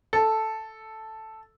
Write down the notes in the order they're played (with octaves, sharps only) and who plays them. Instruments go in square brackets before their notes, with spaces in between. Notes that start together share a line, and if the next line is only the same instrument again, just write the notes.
[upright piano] A4